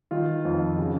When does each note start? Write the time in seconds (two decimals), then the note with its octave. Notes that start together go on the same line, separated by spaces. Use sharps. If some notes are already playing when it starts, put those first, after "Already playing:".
0.11 D#3 F4
0.45 F2
0.79 C#3